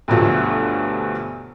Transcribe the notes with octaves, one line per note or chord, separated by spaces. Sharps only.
D2 G2 B2 F3 F#3 A3